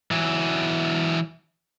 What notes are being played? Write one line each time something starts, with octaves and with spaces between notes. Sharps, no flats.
E3 F#3